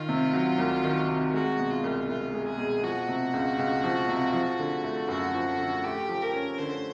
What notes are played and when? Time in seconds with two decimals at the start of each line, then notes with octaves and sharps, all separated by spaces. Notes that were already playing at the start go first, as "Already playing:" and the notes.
Already playing: D#3 F4
0.09 C3
0.33 F#3
0.58 C2
0.84 D#3
1.08 C3
1.34 G#3 F#4
1.58 B2
1.71 F4
1.84 C2
2.09 C2 F4
2.34 G#3
2.46 G#4
2.58 B2
2.83 F3 F#4
3.09 C3
3.33 C#2
3.59 C#2
3.84 F3
4.09 C3
4.33 F3
4.59 D3
4.84 A3
5.09 F#2 F#4
5.34 F3
5.59 D3
5.84 A3 G4
6.09 F3
6.22 A#4
6.33 C#4
6.58 D3 C5